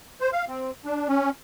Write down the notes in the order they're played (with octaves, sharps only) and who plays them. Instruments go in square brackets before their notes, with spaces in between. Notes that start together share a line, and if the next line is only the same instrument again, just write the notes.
[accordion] C5
F5
C4
D4
C#4